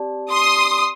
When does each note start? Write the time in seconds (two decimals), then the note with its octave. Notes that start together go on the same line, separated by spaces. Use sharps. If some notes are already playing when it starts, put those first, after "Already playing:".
Already playing: C4 G4 D5 A5
0.32 C6 D#6